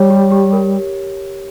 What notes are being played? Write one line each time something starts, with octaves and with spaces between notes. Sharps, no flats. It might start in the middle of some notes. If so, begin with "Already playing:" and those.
Already playing: G3 G4 C#5
G4
G4
A#4